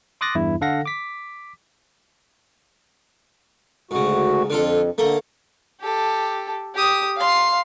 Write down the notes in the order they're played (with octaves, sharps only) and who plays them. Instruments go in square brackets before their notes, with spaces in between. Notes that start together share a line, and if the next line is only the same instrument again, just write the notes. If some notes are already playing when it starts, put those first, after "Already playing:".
[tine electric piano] C6 D6 D#6 F#6 A6 A#6
E2 G2 E4
D3 A4 F5 F#5 A#6
D6 B6
[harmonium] D2 F#4 [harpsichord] G#2 C#3
[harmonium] F2 [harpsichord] D3 F4 A4
[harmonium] D3 [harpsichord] A3 A#3 A4
[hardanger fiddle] G4 A4
G4 D#6
F5 C6